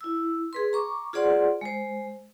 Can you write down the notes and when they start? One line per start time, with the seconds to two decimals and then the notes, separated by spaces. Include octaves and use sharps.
0.01 E4 E6
0.53 G#4 B4 C6
0.73 A#5 C#6 D6
1.13 F4 G#4 C5 D5 F#5 C6
1.61 G#3 C5